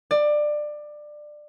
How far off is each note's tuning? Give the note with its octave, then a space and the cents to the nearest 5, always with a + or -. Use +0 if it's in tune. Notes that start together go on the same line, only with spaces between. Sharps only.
D5 +20